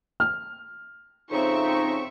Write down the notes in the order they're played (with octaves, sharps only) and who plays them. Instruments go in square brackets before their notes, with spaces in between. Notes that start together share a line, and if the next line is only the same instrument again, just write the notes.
[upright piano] F6
[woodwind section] F2 C#3 D#4 [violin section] C4 E5 C#6